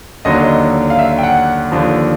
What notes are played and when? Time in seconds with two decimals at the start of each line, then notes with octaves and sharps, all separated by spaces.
0.25 D#2 D3 F#3 D#5
0.90 F5
0.99 E5
1.18 G5
1.23 F#5
1.72 D#2 D3 F3